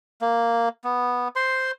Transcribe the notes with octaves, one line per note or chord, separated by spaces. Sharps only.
A#3
B3
C5 C6